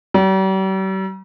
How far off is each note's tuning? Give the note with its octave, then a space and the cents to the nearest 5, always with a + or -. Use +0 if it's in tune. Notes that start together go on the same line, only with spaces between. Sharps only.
G3 -45